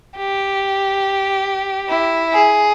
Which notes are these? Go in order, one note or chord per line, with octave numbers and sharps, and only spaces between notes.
G4
E4
G#4